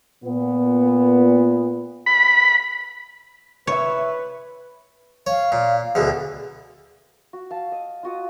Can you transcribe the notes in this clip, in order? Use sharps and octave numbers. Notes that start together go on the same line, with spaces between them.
A#2 B3
B5
C3 E4 B4 C#5 E5
C#5 F5
A#2
D2 B2 D3 G#4
F#4
F5 A5 E6
D#5
F4 F#4 D#6